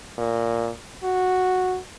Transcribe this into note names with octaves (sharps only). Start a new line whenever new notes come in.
A#2
F#4